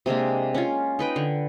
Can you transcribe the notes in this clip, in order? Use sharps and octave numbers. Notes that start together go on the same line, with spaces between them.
C3 G#3 A#3 D4
C#4 F4
D#4 B4 G5
D3